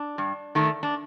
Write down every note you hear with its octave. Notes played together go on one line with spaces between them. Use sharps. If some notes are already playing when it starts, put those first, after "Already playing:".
Already playing: D4
G2
D#3 A3
D4